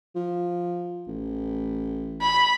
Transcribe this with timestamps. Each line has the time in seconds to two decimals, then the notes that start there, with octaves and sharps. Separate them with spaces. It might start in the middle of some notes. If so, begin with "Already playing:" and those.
0.15 F3
1.07 A1
2.22 B5